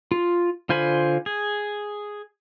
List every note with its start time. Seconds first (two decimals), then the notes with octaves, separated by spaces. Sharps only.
0.12 F4
0.69 D3 F4 C5 G#5 B5
1.26 G#4